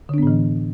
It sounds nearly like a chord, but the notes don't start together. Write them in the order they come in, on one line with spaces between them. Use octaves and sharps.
D3 D4 B3 A2 E3